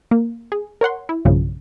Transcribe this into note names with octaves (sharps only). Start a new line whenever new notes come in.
A#3
G#4
A#4 C#5 F#5 C6
E4
B1 G2 C#3 F3